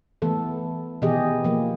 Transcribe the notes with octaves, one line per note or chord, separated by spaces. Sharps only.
E3 A3 B3 A4
B2 D#3 E3 G4 G#4 D#5
F3 A#3